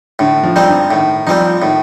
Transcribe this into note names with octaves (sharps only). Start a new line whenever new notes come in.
A2 D3
F3
G3 C4 D#4
G2
A2 D#3
F3 G3 C4 D#4
A2 D#3